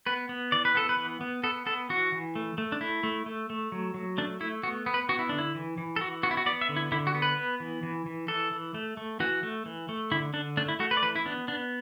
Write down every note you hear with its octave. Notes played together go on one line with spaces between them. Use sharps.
B3 B4
B3
E3 D5
B4
B3 A4
B4
E3
B3
B3 A4
B3 A4
E3 F#4
E3
A3
A3
D4
A3 E4
A3
A3
A3
F#3
F#3
A3 D4
A3 E4
B3 F#4
B3
B4
B3 F#4
E4
D3 D4
E4
E3
E3
A4
E3 F#4
B3 F#4
E4
F#4
B3 D5
E5
D3
E4
D3 E4
F#4
B3
B4
B3
E3
E3
E3
E3 A4
E3
A3
A3
E3 F#4
A3
E3
A3
D3 E4
D3 D4
A3 D4
E4
A3 F#4
B4
D5
E3 B4
E4
B3 D4
B3 D4